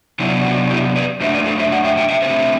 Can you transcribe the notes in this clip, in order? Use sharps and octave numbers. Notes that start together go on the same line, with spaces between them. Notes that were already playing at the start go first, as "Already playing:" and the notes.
C3 F#3 B3 D4 E4
F#4
E4 G4
B4 D5
F#2 F#3 A3 D4 C5 E5
B4 D5
A4 C5
C5 E5
D5 F#5
E5 G5
E5 G5
E5 G5
D3 A3 C4 C5 E5